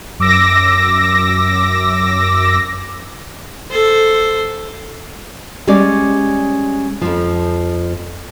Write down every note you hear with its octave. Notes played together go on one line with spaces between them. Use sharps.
F#2 D6 E6 A#6
A4 C5
G3 G#3 C#4 D5
F2 F3